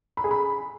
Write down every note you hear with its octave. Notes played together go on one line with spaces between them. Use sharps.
B5
G#4
B5